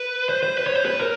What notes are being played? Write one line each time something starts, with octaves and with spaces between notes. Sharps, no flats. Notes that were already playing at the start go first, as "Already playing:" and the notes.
Already playing: B4
C5
C5
B4
C#5
C5
B4
A#4